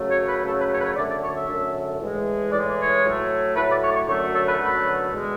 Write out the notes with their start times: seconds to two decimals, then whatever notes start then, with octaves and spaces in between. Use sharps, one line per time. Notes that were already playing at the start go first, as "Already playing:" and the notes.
Already playing: F#2 C#3 F#3 A3
0.10 C#5
0.27 B4
0.44 F#2 C#3 F#3 A3 A4
0.58 B4
0.71 C#5
0.78 B4
0.84 C#5
0.96 F#2 D3 A3 D5
1.09 D5
1.22 C#5
1.35 E5
1.48 F#2 D3 A3
1.99 A2 E3 G#3
2.51 A2 E3 G#3 D5
2.78 C#5
3.03 A2 F#3 A3
3.55 A2 F#3 A3 B4
3.69 D5
3.81 C#5
3.90 D5
3.94 C#5
4.07 F#2 D3 F#3 A3 C#5
4.33 A4
4.46 B4
4.59 F#2 D3 F#3 A3 B4
5.11 E2 B2 G#3